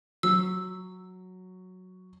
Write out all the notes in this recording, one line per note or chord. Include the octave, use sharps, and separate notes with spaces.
F#3 E6